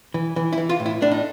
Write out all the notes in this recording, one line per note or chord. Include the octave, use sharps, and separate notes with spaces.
E3
E3
E4
E3
F4
A2
E4
A2 D4
D#4